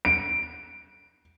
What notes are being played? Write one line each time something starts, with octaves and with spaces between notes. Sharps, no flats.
D7